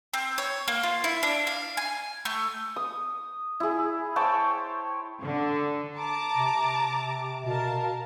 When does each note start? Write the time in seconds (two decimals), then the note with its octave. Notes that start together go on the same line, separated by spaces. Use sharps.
0.14 C4
0.38 C#5
0.68 A#3
0.83 F4
1.04 E4
1.23 D4
1.47 F5
1.77 G#5
2.25 A3
2.76 D#6
3.60 E4 G#4
4.16 C5 C#5 G5 A5
5.21 D3
5.96 A5 A#5 D6
6.37 C3
7.46 B2 A#4 F5 A5